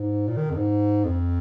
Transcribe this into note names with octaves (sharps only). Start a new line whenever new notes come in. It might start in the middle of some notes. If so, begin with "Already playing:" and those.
Already playing: G#2
A#2
D#3
F2
G#2
F2